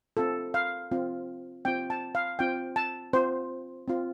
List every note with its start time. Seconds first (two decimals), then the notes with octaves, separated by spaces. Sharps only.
0.17 C4 F4 A4
0.54 F5
0.92 C4 F4
1.65 C4 F4 G5
1.90 A5
2.15 F5
2.39 C4 F4 G5
2.76 A5
3.13 C4 F4 C5
3.88 C4 F4